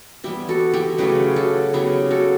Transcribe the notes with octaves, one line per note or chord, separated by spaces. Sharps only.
E3 G3 B3 E4 G4
F#4 A4
E4 G4
C#3 F#3 A3 G4 B4
F#4 A4
C#3 F#3 B3 E4 G4
F#4 A4